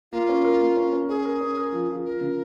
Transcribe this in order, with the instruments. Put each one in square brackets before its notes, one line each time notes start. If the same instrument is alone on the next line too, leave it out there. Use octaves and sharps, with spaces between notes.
[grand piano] A#3 [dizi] F4
[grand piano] C#4
A#4
A#3
C#4
C#4
[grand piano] C#4 [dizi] G#4
[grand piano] A#4
C#4
A#4
F3
F3
[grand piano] F3 [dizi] A#4
[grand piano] C#3